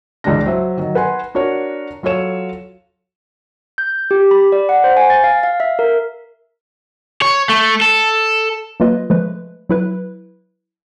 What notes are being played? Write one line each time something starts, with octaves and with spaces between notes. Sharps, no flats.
C#2 E3 G#3 D4 A#6
F#3 C5 E5
D#3 F#3
B4 F#5 G#5 C6
D4 F#4 A#4 C#5
F#3 F4 A4 C#5 E7
G6
G4
B5
D5
F#5
C5
G#5
A6
F5
F5
E5
A#4
C#5
A3
A4
F#3 A#3 F4 B4 D#5
F3 G#3 A3 B4
F#3 E4 B4